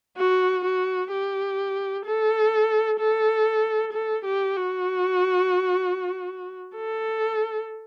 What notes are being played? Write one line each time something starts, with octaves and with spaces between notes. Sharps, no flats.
F#4
F#4
G4
A4
A4
A4
G4
F#4
A4